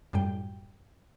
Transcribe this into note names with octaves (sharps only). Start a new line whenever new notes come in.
F#2 A2 G3 G5